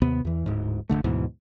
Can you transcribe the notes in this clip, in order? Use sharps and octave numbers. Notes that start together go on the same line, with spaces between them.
D#2 C3 B3
E2 E3
D1 G#2
F1 F2 D3 A3
D2 G#2 B2 E3